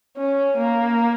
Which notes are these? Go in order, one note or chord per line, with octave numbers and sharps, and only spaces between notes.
C#4
A#3